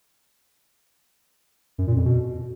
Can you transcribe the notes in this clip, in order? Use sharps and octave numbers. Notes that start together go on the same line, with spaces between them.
F#2
A#2
F2
B2